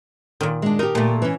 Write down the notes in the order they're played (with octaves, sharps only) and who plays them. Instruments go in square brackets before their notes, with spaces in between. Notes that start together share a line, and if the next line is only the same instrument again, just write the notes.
[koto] A#2 D#3
[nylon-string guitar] G#3 D4
[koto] D#4 [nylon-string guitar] G4 A#4
[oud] A#2 A3
[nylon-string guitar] E3 C#4